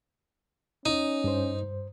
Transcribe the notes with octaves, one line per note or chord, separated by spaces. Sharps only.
C#4 D#4
G2 C5